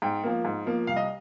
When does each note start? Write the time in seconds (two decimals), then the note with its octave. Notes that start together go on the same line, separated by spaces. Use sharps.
0.02 G#2 G5
0.23 F3 A#3
0.45 G#2
0.66 F3 A#3
0.87 C2 F5
0.96 D#5